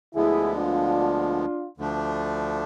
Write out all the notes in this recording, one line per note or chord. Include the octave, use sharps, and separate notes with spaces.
D2 D3 F3 G#3 B3 E4 G#4
D4 F4
D2 D3 F3 A3 D4